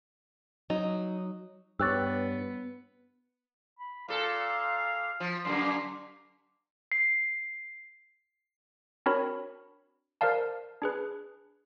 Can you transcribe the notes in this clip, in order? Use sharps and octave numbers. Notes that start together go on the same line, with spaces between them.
F#3 D#4
G2 B3 G4 C#5 E6 F#6 A6
B5
A#2 A4 F5
F3
F#2 D3 A#3 C6
C7
C4 D4 F#4 A#4 C#5 B5
A#4 C5 D5 F5 A5
D4 G#4 B4